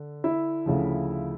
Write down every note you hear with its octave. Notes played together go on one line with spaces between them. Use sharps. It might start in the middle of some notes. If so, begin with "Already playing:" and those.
Already playing: D3
E4 E5
D2 C#3 F3